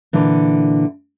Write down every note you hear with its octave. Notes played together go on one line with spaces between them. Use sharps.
A#2 D3 E3